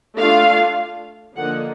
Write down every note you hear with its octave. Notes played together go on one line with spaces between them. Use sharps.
A3 D4 F4 F5
D3 F3 A#3 D#4 F#5